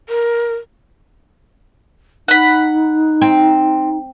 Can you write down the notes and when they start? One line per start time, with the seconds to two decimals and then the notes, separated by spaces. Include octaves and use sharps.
0.09 A#4
2.28 D#4 F#5 B5
3.21 C4